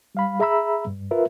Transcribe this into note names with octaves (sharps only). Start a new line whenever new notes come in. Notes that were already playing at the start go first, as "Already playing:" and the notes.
G3 F5 B5
G#4 E5 A#5 B5 E6
G2
F4 A#4 B4 E5